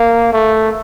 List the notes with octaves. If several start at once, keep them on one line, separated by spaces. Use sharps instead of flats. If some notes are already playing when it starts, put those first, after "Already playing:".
Already playing: A#3
A3